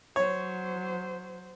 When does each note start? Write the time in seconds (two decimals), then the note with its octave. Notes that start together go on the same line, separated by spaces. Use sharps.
0.16 F#3 C5 C#5